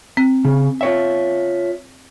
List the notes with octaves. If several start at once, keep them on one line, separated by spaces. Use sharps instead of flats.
C4
C#3
F4 C#5 E5